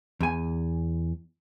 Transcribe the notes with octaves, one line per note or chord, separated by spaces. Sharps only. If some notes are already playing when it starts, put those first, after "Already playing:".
E2 G#5